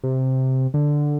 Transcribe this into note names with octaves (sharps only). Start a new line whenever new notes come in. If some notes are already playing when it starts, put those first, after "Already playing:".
C3
D3